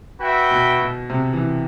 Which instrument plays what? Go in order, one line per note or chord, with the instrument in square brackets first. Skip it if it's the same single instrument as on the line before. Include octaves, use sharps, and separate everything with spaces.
[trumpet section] F#4 B4 E5 G5
[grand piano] B2
B2
C3
E3